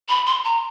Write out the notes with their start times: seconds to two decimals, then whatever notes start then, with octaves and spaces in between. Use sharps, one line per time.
0.09 B5
0.26 C6
0.44 A#5